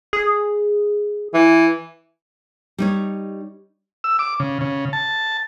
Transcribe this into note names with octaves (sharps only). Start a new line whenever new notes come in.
G#4
E3
G3 D#4 C#5
E6
D6
C#3
C#3
A5